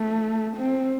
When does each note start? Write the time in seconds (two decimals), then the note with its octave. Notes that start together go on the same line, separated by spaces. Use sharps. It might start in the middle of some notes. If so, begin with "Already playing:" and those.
Already playing: A3
0.57 C4